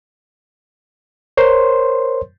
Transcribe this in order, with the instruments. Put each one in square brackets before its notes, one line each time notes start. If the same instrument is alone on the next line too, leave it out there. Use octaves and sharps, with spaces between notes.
[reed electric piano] A#4 C5 C#5 C6